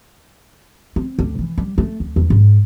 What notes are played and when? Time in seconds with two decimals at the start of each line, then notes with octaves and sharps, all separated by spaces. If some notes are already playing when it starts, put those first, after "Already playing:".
0.96 C4
1.19 D2
1.39 E3
1.58 G3
1.78 A3
2.00 D2
2.16 E2
2.30 G#2